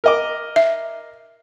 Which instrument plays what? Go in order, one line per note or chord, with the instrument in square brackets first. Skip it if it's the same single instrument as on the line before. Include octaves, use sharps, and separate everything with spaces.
[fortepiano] A#4 D#5 D6
[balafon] E5